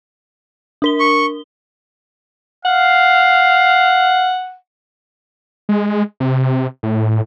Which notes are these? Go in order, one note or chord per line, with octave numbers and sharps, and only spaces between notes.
D4 A#4 G7
C#6
F5 F#5
G#3
C3
A2